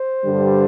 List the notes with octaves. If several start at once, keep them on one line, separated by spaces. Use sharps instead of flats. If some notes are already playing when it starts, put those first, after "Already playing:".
Already playing: C5
G2 D3 G3